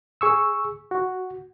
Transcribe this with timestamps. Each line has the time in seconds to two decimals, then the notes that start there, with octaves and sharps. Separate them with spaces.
0.21 G#4 C#6 E6
0.91 F#4